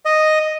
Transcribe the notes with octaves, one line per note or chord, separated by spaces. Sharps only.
D#5